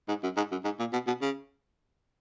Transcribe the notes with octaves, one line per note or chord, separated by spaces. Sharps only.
G#2
F#2
G#2
F#2
G#2
A#2
B2
B2
C#3